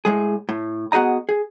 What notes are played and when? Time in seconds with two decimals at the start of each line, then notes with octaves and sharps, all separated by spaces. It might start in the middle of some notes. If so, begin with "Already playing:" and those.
0.05 A2 G#3 G#4
0.49 A2
0.92 B3 F#4 G#4 D#5 A#5
1.29 G#4